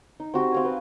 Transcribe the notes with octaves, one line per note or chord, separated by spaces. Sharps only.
D#4
C4 F#4 G4
C4 F5 G#5
B4